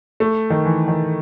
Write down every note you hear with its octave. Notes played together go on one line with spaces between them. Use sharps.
A3
D#3
E3
D#3